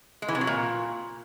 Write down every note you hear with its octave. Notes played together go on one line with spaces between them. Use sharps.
G#3
E3
C3
F#3
A#2